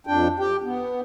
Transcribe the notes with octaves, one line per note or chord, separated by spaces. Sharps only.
F2 D4 G5
G4 G5
B3